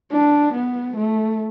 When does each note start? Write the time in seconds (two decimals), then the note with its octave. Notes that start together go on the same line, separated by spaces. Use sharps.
0.12 D4
0.53 B3
0.96 A3